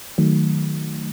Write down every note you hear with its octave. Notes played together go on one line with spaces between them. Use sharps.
D#3 F#3 A3